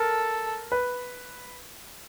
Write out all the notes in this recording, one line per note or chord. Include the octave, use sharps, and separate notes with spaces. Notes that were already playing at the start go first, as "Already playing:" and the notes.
Already playing: A4 A#4
B4